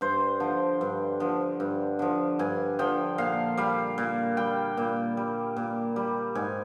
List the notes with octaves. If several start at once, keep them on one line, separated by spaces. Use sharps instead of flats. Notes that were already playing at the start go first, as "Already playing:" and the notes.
G2 C5
D3 F3
G2
D3 F3
G2
D3 F3
G2 G#5
D3 F3 G5
A#2 F5
G3 F5
A#2
G3 G5
A#2
G3
A#2
G3
G#2 G#5